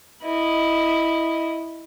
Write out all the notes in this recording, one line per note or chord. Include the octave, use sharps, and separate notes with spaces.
E4 D#5